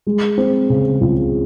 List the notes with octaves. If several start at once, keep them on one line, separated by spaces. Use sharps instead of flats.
G#3
C4
C#3
C#2